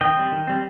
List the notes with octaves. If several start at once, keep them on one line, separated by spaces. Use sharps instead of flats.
D#3 D#5 G5
G3 C4
D#3
G3 C4